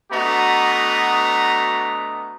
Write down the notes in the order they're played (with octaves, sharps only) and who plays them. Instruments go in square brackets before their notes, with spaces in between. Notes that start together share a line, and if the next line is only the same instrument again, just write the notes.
[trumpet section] A3 B3 D4 F#4 D#5 A#5